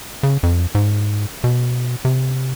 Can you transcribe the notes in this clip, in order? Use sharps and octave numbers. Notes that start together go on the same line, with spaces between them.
C#3
F2
G#2
B2
C3